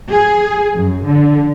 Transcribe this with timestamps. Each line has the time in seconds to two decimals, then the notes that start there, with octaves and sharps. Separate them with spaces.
0.12 G#4
0.76 F#2
1.07 D3